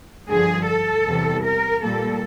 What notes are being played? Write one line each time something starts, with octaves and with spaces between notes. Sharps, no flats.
G2 D3 F3 G#4
A4
E2 C3 E3 G3
A#4
A#2 G3 A#3 A4